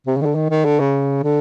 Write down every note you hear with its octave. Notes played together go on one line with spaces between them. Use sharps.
C3
C#3
D#3
D3
D#3
D#3
D3
C#3
D3